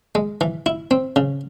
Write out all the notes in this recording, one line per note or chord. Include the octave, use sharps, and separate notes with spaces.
G#3
E3
E4
C4
C#3